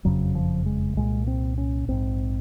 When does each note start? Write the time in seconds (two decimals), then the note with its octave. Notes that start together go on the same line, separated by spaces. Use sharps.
0.05 F#1 F2 C#3 F#3
0.35 F3
0.66 G#3
0.97 C2 A#2 G#3
1.27 C4
1.58 C#4
1.88 A#1 G#2 C4